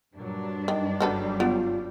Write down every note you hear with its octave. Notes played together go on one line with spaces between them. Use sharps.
G2 A#2 F#3 D4
D#3
F#1 F#3 G3 F#4 A4 B4
B3 F4